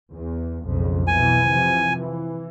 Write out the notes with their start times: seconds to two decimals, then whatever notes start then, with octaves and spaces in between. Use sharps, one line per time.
0.11 E2
0.65 B1 F2 C#3
1.07 B1 B2 E3 G#5
1.46 C3 E3 F3
1.97 E3